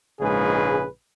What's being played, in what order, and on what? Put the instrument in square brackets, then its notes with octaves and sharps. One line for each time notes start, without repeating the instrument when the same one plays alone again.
[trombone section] A#1 G#2 C#3 G#3 G#4 B4